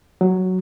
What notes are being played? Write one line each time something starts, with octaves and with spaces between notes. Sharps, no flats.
F#3